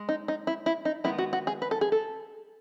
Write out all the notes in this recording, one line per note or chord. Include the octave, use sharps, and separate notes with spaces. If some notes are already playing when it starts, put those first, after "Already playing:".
Already playing: G#3
D#4
D#4
E4
E4
D#4
D#3 G#3 B3 D#4 E4
F#4
F#4
G#4
B4
A4
G#4
A4